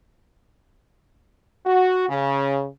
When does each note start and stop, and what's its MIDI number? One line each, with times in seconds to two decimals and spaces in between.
1.66 2.07 66
2.10 2.66 49